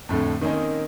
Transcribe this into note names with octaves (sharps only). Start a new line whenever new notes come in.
F2 A2 D3 A3
D#3 A#3 C4 C#4 D#4